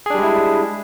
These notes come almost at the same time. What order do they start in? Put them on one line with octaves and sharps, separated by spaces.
G#4 D4 G3 G#3 E4